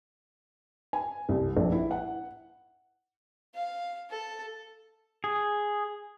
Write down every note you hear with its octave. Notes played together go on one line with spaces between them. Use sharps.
G#5
C2
A#1
E4
F#5
F5
A4
G#4